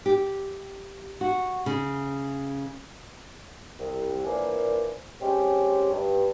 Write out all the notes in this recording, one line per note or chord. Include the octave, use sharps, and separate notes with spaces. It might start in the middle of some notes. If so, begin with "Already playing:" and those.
G4
F#4
C#3
C2
A#2 E3 A#3 D4 C5 G#5
F#3 G#3 C4 C#4 G4
G2